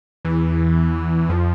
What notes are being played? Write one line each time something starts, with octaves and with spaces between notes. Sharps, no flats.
E2 E3
F2 F3